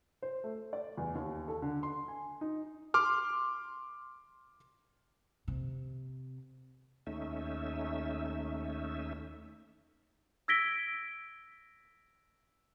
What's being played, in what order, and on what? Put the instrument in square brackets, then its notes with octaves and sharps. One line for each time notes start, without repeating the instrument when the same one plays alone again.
[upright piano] C5
A3
D5
E2
D#2
A4
D3
C6
G#5
D#4
[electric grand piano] C6 D6 F6
[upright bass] C3
[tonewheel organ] D#2 A3 C#4 D#4 E5
[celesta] E6 G#6 A#6 B6 D7 G7